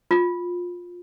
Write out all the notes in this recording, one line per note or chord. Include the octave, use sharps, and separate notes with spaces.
F4